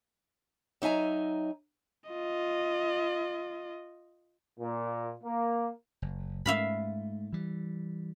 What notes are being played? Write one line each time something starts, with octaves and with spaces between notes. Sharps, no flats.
F#3 D#4 E5 G#5 A#5
F4 D#5
A#2
A#3
F#1
G#2 A3 E5 F5 B5
E3 G3